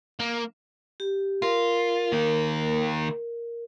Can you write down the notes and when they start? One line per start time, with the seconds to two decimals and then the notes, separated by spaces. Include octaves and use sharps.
0.19 A#3
1.00 G4
1.42 F4 A#4
2.12 D#3 A#3